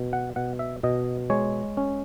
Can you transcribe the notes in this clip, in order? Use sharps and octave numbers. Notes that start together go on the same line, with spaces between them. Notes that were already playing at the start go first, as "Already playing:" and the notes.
Already playing: B2
F#5
B2 F#5
E5
B2 D#5
G#3 C#5
C#4